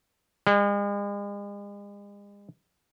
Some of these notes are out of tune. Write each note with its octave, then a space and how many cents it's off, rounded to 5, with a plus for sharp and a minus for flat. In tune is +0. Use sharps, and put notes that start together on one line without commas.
G#3 -40